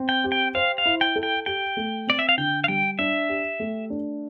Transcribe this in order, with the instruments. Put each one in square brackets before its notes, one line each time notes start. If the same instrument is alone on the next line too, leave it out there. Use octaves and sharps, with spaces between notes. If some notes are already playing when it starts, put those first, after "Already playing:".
Already playing: [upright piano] C4
[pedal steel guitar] G5
[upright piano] G4
[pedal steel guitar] G5
[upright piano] C5 [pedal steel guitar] F5
[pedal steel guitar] F5
[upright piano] E4
[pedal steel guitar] G5
[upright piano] A4
[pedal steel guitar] G5
[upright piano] G4 [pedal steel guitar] G5
[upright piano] A3
[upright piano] C4 [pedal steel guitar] D5
[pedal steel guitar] E5
F5
[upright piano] D3 [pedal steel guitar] G5
[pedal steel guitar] F5
[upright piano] G3 [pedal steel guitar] G5
[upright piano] D4 [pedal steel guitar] E5
[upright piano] G4
A3
D4